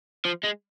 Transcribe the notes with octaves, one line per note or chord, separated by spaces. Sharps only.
F3
G#3